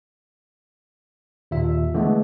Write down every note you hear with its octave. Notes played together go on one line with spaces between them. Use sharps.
D#2 A#2 E5
D3 E3 G#3 A3 B3